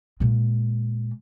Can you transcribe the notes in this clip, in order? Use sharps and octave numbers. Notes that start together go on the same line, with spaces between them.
A#2 G#3